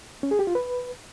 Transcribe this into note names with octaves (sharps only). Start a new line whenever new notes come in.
C#4
G#4
G4
F4
B4